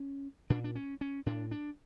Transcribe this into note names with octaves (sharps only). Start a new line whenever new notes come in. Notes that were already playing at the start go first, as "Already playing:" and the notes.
Already playing: C#4
A#2 D4
D4
C#4
C#4
A2 D4
D4